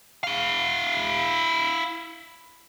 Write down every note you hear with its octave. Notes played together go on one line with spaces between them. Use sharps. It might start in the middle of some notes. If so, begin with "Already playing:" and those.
E4 F5